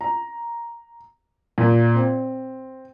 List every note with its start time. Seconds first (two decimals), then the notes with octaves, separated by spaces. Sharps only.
0.01 A#5
1.58 A#2
1.95 C4